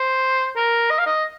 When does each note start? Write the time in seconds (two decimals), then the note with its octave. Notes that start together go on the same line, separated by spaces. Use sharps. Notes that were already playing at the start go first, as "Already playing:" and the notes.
Already playing: C5
0.56 A#4
0.90 D#5
0.99 F5
1.06 D#5